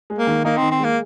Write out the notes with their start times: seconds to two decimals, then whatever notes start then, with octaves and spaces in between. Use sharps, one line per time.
0.10 G#3
0.19 A#3
0.27 D#3
0.45 A#3 D#4
0.57 C4
0.63 D#3
0.71 C4
0.80 G#3 A#3